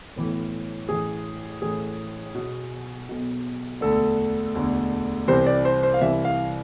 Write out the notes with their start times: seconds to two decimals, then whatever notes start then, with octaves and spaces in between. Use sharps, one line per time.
0.16 B1 A2 E3
0.89 A1 A2 E3 G#4
1.62 A1 A2 E3 G#4
2.35 B1 B2
3.09 B1 B2
3.81 E1 D2 D3 A4
4.55 E1 D2 D3
5.28 C2 C3 E3 C5
5.46 D5
5.65 C5
5.83 C5
5.94 F5
6.01 C2 C3 E3 E5
6.25 F5